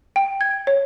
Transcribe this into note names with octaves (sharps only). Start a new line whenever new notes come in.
G5
G#6
C#5